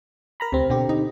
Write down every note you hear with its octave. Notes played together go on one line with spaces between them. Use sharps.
A#4 A#5 B5
D2 C3 C4
B2 D3 C4 G4
D#4